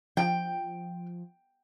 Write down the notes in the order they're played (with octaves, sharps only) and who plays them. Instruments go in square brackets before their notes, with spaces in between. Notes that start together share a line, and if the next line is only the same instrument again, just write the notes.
[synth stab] F3 [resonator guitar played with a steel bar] G5